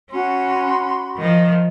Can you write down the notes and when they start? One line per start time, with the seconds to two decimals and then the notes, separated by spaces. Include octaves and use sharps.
0.11 C#4 F#4 B5 C6
1.18 D#3 F3